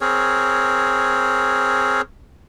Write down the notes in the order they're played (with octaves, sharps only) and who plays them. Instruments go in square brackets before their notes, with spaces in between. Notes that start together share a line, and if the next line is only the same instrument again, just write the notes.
[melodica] C4 G#4 A#4 C#5